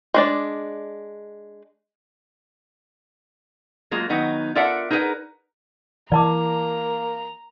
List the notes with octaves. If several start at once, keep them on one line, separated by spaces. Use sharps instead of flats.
G#3 D4 D5
F#3 G#3 A#3 F4
D#3 F#3 B3 D#4
F4 A4 A#4 D5 E5 F#5
D#4 G#4 A#4 B4 F#5
E3 A#3 D5 A5 A#5 D6